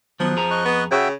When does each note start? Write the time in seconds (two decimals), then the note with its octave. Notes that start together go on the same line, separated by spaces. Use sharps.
0.20 D#3 F3 F#3 B3
0.36 F2 G#4 A#5
0.51 D#5 C#6 F#6
0.65 B3
0.91 C#3 F#4 E5 G5